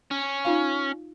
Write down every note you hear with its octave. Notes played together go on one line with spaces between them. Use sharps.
C#4
D#4 F4 F5